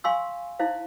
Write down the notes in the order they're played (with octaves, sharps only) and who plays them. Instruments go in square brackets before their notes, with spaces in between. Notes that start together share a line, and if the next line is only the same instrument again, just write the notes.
[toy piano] F5 G#5 C6 C#6 E6
D#4 E4 C5 F5